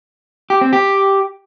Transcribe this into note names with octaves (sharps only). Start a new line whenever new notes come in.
G4
C4
G4